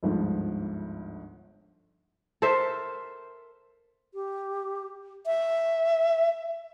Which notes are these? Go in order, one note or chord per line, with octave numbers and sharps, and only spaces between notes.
G1 D2 G#2 F3
A4 A#4 C5 E5
G4
E5